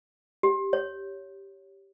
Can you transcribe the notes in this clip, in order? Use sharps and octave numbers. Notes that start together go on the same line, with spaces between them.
G4
C#5